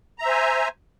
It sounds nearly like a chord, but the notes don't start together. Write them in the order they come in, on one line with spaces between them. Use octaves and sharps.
A#5 E5 C5 G#5